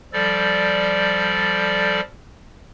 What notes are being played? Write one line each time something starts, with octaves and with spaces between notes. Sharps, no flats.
F3 G3 A4 D5